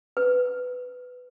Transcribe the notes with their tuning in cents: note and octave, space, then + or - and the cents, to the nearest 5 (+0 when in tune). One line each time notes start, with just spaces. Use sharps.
B4 +15